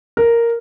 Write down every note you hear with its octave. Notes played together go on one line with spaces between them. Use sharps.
A#4